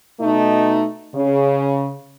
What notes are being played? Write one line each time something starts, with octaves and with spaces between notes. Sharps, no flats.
B2 A3 D#4
C#3